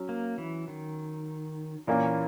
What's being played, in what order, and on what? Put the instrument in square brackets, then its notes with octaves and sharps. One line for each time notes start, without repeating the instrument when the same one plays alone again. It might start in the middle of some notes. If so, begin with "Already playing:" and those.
Already playing: [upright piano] F#3 C#4
[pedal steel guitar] A#3
E3
D#3
[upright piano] A#2 A#3 C#4 [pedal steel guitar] E3